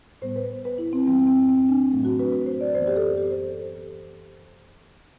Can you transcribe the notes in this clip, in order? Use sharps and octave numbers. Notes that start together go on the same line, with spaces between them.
A2 G3 B3 C5
B4
B4
E4
C4
F#2 E3 G3 B3 C4
C4
C4
D4
A2 F#3 A3
F#4
B4
B4
C5
D5
F#2 E3 B3 C5
G4
A4
G4
C5